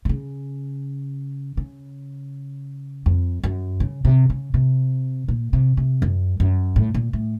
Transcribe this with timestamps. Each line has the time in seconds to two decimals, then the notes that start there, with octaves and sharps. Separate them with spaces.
0.05 C3
0.09 C#3
1.57 C#3
3.06 F2
3.44 F#2
3.80 C#3
4.05 C3
4.30 C#3
4.54 C3
5.28 A#2
5.53 C3
5.77 C3
6.02 F#2
6.40 F#2
6.76 A2
6.94 A#2
7.13 A2